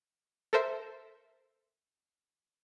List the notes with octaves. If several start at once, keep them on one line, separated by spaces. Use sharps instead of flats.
A4 A#4 C5 E5